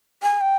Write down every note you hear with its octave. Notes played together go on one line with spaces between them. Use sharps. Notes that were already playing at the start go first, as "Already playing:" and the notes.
G#5
G5